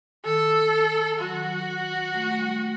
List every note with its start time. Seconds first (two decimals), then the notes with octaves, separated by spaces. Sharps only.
0.25 D#3 A4
1.19 F#3 F#4
1.32 D#3
1.45 F#3
2.14 A3
2.31 A3
2.38 G3
2.61 G3